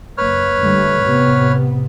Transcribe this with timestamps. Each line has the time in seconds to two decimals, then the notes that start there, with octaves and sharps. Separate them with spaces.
0.18 F#1 A#3 B4 C#5 F6
0.58 D3 G3 A3
1.02 A2 C3 B3